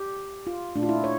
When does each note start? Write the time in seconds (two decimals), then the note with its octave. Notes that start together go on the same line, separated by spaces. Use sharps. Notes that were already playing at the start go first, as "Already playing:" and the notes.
Already playing: G4
0.47 F4
0.76 A#2 A3 D4
0.83 F4
0.89 E4
1.04 C#5